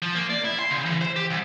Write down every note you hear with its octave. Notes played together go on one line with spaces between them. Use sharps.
F3
A#3
D5
E4
C6
C#3
E3
C5
G4
C2